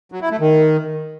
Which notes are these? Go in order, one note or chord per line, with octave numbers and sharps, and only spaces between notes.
F#3
E4
A3
D#3